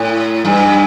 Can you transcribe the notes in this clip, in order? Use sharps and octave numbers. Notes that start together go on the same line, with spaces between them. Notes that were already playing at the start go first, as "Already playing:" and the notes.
Already playing: A2
G2